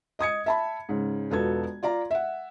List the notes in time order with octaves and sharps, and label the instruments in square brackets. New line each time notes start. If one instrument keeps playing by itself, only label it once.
[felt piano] D#5 D#6 G#6 C#7
E5 A5 B5
G#2 C#3
E1 B3 F4 F#4 A4 G#6
F4 D5 F5 A#5
E5 F#5